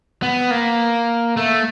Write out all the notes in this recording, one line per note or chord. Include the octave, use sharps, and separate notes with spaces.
B3
A#3
A3